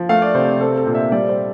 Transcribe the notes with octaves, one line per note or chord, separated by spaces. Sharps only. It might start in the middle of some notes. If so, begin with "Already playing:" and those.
Already playing: F3
A3 F5
D5
C3 C5
C4 A4
A4
A#2
E5
G3 D5
C5